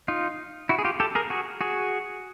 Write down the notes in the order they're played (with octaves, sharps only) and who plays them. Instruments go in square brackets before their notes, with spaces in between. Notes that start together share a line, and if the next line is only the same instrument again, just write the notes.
[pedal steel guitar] D#4 F4
E4 F#4
G#4
F4 G4
G4 A4
G#4 A#4
F#4 G#4
F#4 G#4